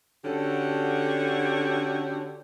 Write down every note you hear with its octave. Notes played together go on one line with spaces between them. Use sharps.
D3 C#4 F#4 G4 A4